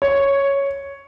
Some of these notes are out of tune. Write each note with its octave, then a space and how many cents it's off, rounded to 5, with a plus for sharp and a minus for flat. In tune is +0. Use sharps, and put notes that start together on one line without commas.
C#5 +0